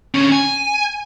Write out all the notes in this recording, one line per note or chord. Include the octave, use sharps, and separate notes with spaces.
D3 C#4
G#5